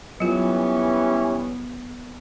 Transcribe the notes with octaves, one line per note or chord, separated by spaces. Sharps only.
E3 F#3 G3 B3 C#4 F4